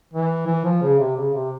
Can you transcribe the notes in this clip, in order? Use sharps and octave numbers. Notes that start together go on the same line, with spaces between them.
E3
E3
F3
C#3
C3
C#3
C3